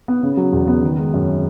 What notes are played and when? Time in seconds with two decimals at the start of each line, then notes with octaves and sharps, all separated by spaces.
0.08 B3
0.23 C#3
0.37 F#3
0.53 E2
0.67 B3
0.83 D#3
0.99 G#3
1.14 F#2
1.28 C#4